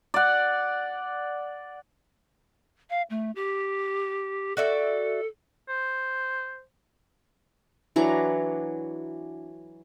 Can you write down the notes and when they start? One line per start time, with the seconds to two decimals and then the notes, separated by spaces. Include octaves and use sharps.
0.14 D5 F#5
2.90 F5
3.10 A3
3.36 G4
4.57 F#4 A4 D5 E5
5.68 C5
7.96 E3 F#3 D4 A#5